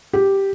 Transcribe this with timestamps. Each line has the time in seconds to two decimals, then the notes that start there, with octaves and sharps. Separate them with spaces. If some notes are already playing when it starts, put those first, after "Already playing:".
0.13 G4